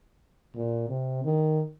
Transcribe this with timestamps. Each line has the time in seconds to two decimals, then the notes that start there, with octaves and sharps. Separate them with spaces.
0.56 A#2
0.89 C3
1.24 D#3